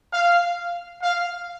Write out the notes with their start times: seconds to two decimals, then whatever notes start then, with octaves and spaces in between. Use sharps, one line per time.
0.12 F5
1.02 F5